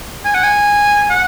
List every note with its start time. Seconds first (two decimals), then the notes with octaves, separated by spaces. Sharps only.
0.25 G#5
0.34 F#5
0.43 G#5
1.10 F#5